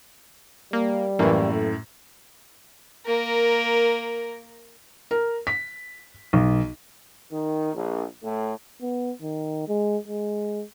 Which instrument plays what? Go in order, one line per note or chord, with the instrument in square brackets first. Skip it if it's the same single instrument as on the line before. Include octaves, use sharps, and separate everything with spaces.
[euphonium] G3 [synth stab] A#3
[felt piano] F#2 A2 [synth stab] E3 A#3
[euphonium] A4
[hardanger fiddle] A#3 A#4
[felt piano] A#4
B6
B1
[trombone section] D#3
A#1
A2
[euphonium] B3
D#3
G#3
G#3